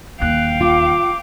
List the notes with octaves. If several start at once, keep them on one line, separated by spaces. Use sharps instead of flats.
D#1 D#2 F5 G5 F#6
F4 D6